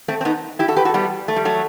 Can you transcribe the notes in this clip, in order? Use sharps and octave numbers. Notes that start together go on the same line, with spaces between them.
A3 C4
C4
B3 D#4
E4 G4
F#4 A4
G4 B4
F#4 A4
G3 B3
A3
G3
F#3 A3